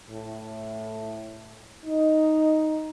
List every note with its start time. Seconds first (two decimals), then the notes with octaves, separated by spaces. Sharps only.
0.11 A2
1.85 D#4